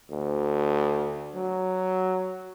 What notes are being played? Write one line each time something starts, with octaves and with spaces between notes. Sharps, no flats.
D2
F#3